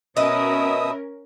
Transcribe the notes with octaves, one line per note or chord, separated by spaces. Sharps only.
B2 C#4 A#4 B4 D#5 E5 D#6